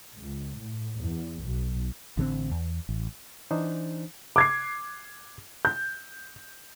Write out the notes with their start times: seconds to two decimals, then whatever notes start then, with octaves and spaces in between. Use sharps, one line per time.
0.18 C#2
0.57 A2
1.00 E2
1.44 B1
2.17 A1 D3 F#3 C4
2.51 E2
2.89 A1
3.51 E3 D4 D#4 C5
4.36 D6 G#6 C7
5.65 G6